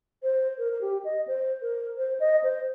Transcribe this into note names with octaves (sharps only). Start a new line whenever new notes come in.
C5
A#4
A#4
G4
D#5
C5
A#4
C5
D#5
C5